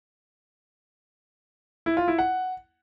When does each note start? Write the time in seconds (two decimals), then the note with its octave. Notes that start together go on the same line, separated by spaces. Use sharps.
1.86 E4
1.97 F4
2.08 E4
2.19 F#5